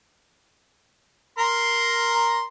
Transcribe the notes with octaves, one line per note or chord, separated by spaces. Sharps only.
A#4 A#5 C6